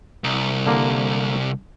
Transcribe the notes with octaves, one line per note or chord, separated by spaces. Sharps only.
C2
D3 A#3